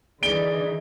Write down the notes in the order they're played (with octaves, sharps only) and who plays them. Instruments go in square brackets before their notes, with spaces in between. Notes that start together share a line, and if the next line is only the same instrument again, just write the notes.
[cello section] D3 E3 D#4 [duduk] G#4 [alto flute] D5 [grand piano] D7 G7